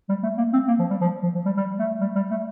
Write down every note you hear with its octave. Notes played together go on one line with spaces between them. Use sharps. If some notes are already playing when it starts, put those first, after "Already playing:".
G3
A3
A#3
C4
A#3
F3
G3
F3
F3
F3
G3
G3
A3
G3
G3
A3